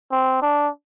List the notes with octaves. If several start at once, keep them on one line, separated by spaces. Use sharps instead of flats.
C4
D4